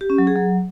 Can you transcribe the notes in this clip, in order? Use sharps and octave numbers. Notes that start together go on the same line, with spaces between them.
G4
C#4
F#3
G#4
F#3